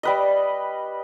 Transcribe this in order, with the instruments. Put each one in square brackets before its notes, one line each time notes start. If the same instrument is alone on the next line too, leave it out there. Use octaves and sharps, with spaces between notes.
[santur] G3 B4 D#5